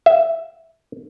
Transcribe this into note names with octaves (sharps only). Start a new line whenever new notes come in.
E5